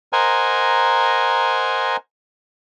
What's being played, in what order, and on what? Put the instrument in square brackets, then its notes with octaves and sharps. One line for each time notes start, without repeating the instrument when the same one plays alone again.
[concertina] A#4 C5 D#5 F#5 G#5 A#5